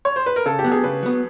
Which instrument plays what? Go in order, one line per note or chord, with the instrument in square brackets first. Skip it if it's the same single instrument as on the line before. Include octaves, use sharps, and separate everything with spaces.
[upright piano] C#5
C5
B4
A#4
[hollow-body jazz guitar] C#3 [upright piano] A4
[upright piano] G4
[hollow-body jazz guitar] F#3 B3
[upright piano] G#4
[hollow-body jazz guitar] C#3 [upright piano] B4
[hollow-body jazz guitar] F#3 B3